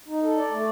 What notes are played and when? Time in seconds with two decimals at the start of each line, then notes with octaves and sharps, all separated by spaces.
0.08 D#4
0.23 A4
0.37 D5
0.52 A3